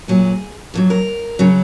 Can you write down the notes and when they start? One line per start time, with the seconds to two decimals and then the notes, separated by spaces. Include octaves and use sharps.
0.08 A#2 F#3 G#4
0.74 F2 D#3 F#3
0.90 A#4
1.39 C#3 F#3